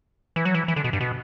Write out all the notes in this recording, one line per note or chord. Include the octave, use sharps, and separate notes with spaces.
E3
F#3
E3
E3
D3
B2
G2
B2